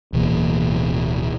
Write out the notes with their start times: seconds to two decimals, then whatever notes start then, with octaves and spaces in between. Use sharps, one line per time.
0.13 D1 B2 E3 A#3